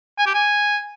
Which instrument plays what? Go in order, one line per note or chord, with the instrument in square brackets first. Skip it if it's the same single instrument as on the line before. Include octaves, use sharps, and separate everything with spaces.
[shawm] G#5
G4
G#5